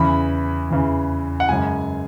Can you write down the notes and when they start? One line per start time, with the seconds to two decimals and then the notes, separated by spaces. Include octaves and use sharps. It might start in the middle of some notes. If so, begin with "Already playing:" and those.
Already playing: E2 C#3 E3 B5
0.70 E2 C#3 E3
1.40 F#5
1.49 F#2 C#3 G#3 G#5